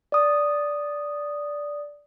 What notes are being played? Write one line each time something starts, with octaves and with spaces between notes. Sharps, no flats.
D5 D#6